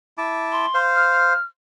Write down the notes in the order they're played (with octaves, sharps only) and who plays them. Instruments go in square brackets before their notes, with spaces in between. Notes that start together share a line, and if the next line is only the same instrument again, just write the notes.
[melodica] E4 A5 D6
[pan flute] C6
[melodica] C5 F5
[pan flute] F6